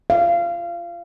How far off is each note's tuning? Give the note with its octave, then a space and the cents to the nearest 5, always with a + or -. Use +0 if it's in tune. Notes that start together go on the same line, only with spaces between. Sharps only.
F5 -25